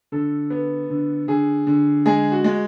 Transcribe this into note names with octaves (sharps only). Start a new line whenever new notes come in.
D3 A4
B3
D3
D3 G#4
D3
G#3 G#4
F#4
G#3